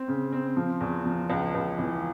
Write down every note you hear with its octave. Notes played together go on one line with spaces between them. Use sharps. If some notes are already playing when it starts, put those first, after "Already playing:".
Already playing: C4
C#3
C4
F3
E2
F3
C#2
C#2
E3